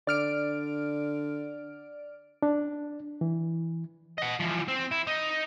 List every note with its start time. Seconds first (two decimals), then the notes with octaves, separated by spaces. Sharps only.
0.07 D3 D5 F6 D7
2.42 D4
3.21 E3
4.18 D#5 F#5
4.40 E3 F3
4.68 C4
4.91 E4
5.07 D#4